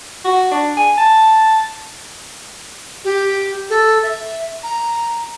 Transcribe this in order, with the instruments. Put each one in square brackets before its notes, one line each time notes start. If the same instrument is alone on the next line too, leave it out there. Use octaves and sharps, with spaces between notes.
[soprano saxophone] F#4
D4
G#5
A5
[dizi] G4
A4
E5
A#5